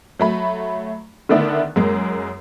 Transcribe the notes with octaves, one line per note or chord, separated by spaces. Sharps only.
F#3 A3 B5
D3 D#3 A3 B3 D4 E4
F#2 G#3 A#3